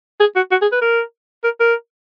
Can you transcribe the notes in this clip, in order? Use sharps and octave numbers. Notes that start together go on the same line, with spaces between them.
G#4
F#4
F#4
G#4
B4
A#4
A#4
A#4